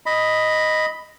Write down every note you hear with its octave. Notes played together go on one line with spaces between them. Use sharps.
D#5 B5